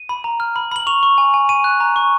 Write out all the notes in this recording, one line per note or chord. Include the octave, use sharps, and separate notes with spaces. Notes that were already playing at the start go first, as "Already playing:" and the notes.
Already playing: D#7
B5
A#5
F6
B5
B5 F#7
C#6 F7
C#6
G#5
G#5
G#5 D#7
F#6
A#5
C#6